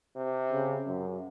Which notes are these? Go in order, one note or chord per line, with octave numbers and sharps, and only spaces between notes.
C3
C#3
F#2